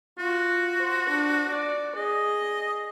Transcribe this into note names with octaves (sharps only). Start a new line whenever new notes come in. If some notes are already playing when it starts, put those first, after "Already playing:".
F4 F#4
C5
D4
D5
G#4 D#5